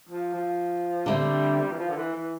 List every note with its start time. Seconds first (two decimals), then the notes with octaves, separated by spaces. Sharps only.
0.09 F3
0.33 F3
1.06 D3 G3 A3 C4
1.71 E3
1.78 F3
1.89 D3
1.96 E3
2.14 E3